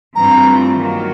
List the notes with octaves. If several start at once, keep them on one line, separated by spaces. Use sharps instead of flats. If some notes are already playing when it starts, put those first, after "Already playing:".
G2 E3 A3 C4 F4 A#5
D#3 F#3 A#3